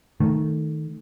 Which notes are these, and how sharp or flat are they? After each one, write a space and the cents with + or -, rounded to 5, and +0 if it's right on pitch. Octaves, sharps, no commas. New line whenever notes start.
D#3 +0 A3 +0